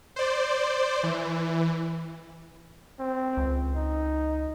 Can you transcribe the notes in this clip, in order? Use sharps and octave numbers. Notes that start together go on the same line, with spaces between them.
C5 D5
E3
C4
C#2
D#4